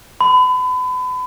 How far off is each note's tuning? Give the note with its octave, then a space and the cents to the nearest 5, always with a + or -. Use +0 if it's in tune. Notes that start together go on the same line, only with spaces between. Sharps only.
B5 +35